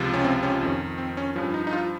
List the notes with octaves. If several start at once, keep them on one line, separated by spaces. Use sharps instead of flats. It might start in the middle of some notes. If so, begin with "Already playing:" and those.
Already playing: C#2 C3 F3
C#4
C4
C#4
F2 D#3 C#4
C4
C#4
G2 F3 C#4
D#4
D#4
F4